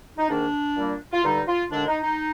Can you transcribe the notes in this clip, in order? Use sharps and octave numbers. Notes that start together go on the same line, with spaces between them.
D#4
G#2 D#3 A#3 D4
A#2 G3 A#3
F4
G2 D3 G3 D#4
F4
D#2 D3 G#3 D4
D#4
D#4